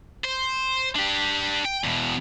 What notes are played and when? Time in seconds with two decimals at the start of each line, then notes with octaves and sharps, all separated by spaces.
0.24 C5
0.96 D4 G4
1.65 G5
1.84 E2 B2